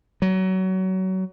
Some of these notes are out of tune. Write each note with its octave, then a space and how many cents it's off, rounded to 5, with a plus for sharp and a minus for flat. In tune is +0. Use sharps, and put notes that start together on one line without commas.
F#3 +25